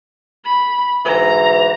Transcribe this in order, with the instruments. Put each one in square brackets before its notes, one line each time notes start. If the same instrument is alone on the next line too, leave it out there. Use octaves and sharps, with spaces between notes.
[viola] B5
[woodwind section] D2 G#2 E3 [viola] A#5